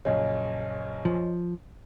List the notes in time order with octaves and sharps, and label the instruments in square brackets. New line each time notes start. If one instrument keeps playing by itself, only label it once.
[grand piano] A#1 F#2 C#3 [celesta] C#5 D#5
[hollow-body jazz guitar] F3